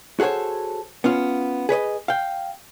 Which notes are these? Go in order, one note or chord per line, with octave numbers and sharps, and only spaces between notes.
F#4 G#4 A4 C5 C#5
B3 C#4 F4
G#4 B4 C#5 D#5
F5 G5